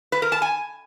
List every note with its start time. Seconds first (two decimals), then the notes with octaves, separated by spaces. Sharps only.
0.12 B4
0.22 A#4
0.32 A5
0.42 G#5